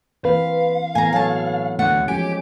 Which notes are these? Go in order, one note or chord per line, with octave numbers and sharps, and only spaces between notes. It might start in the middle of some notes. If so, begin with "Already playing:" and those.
E3 A#3 C4 B4 F5
A2 E3 A3 B3 G#5 A#5
F#3 A4 C#5 G#5 A5
A3 D4 F#5
F3 G#3 C#4 G4 G#5 D7